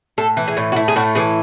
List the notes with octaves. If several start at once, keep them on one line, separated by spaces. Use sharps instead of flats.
A2 A4
E3
G#4
A2
F#4
A3 E4
G#4
A2 F#4
E3 G#4